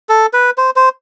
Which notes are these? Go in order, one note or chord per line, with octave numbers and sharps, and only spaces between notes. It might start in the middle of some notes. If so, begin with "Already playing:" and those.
A4
B4
C5
C5